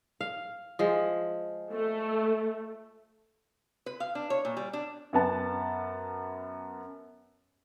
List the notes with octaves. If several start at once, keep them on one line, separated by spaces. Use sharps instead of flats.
F5
F3 G#3
A3
B4
F5
D4
C#5
A#2
G3
D4
F#2 B3 A5